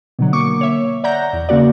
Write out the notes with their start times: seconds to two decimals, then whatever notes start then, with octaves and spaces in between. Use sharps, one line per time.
0.19 B2 D3 F#3
0.33 A#3 C#6 D6 C#7
0.61 C#5 E5
1.04 D5 E5 F#5 A#5 G6 A#6
1.33 E2
1.49 C#3 A#3 F#4 D5